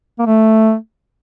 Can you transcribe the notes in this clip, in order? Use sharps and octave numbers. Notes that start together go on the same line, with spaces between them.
A#3
A3